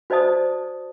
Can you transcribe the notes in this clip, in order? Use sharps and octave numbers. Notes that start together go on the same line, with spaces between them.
F#4 C5 D5 D#5 A5 D#6